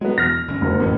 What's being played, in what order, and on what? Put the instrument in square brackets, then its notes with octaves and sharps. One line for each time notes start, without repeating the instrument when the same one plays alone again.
[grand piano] F#3 B3 [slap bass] G#3
[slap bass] E2 B2 [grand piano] F6 A#6
[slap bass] G1 D3 C#4
[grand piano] F#1 D2 A#4
[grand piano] A1 [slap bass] B3 C#4